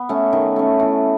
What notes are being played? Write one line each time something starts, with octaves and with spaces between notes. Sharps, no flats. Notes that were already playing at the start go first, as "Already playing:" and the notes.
Already playing: B3
A3 C#4
D#3
A3 C#4
E3